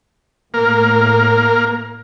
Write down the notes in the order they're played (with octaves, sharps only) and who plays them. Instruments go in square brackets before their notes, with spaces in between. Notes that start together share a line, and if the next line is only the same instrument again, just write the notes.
[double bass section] A2 [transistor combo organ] A#3 A#4